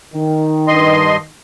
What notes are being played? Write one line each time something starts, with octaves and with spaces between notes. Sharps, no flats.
D#3
G2 D#5 C6